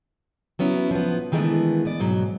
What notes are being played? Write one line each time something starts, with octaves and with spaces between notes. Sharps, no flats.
F#3 B3 C#4 E4
F3 B3
D#3 E3 G#3 A3 B3 D4
B3 D5
G#2 B2 F#3